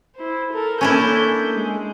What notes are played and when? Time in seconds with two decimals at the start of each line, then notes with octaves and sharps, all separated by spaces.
0.15 E4 C5
0.52 A4 A#4
0.81 A#3 C#4 D4 E4 A4 G6
1.51 G#3